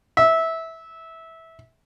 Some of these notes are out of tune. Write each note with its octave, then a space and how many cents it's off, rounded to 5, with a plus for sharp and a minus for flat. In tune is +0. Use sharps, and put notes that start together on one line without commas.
E5 -15